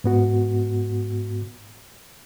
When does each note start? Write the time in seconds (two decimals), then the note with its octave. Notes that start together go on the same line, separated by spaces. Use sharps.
0.04 G#2 B3 F#4